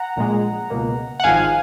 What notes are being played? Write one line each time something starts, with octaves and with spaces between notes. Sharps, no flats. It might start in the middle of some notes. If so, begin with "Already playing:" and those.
Already playing: F#5 A#5
A#1 A#2 G#3
C#2 B2 A#3
F#5
G#1 G#2 F3 F5 G#5